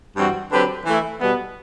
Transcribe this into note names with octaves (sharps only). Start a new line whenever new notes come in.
G2 E3 G3 C4 F#4
D3 F#3 C4 G4 B4
E3 A3 E4
B2 G3 B3